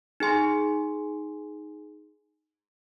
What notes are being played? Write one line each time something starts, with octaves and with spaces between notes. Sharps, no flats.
D#4 G#4 G#5 C6